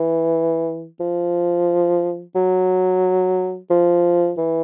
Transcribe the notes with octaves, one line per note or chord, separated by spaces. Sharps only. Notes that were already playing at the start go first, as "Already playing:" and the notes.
Already playing: E3
F3
F#3
F3
E3